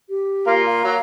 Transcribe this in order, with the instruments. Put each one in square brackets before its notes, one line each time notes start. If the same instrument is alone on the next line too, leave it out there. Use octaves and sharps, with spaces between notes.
[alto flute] G4
[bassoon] A#3 [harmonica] F4 A#4
[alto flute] F5
[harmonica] F#3 A#5